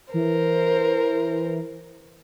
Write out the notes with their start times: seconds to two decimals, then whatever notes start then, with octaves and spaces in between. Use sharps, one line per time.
0.14 E3 A#4 C5